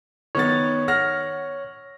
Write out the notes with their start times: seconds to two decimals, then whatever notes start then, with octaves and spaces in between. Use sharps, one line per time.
0.35 D#3 B3 C#5 A6
0.88 F#5 F6 A#6